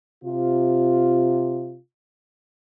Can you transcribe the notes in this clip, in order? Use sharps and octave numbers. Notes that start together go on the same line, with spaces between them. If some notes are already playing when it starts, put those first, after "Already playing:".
C3 F4